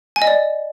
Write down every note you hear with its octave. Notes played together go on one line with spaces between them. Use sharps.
G#5
D#5
D5